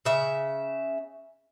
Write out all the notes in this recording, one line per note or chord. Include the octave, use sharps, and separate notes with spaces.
C#3 E5